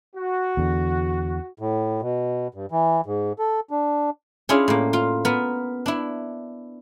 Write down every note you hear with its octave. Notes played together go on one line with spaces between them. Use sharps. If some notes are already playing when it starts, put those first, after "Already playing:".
F#4
E2 D3
A2
B2
G2
E3
G#2
A4
D4
C#4 D4 E4 F4 G#4
A2 A#3
F4
B3 A#4
D4 E4